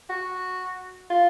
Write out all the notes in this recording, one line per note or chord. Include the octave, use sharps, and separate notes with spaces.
F#4
F4